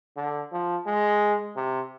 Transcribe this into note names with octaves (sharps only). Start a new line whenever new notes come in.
D3
F3
G#3
C3